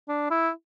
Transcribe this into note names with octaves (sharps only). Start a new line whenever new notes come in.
D4
E4